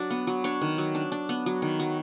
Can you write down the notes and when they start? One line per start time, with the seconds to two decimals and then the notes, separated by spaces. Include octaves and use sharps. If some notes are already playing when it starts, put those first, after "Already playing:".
Already playing: F#3 D4 D5
0.10 B3
0.27 F#3
0.44 D4 C#5
0.61 D#3
0.78 F#3
0.95 D4
1.12 D4
1.29 B3
1.46 F#3
1.62 D#3
1.79 F#3